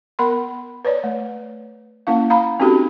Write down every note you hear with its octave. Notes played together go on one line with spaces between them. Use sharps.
B3 A#4 B5 C6
B4 C#5 D5
A3
A#3 C#4 E4 F5
F5 A#5 B5
C4 C#4 D#4 F#4 G4 A4